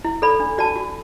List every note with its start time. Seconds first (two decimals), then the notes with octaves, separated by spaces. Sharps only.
0.05 E4
0.22 A4 D5 B5
0.40 D4
0.58 F#4 D5 A5
0.75 F#4